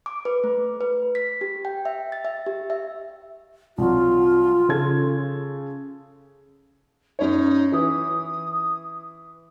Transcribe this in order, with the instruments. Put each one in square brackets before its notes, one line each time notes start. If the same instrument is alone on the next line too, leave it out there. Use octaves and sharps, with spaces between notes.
[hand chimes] D6
B4
A3
B4
B6
G4
G5
E5
A6
E5
G4
E5
[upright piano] C2 F#3 [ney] F4
[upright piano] C#3 A4 G#6
[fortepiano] F#2 C#5 [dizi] D#4
[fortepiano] E3 [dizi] D#6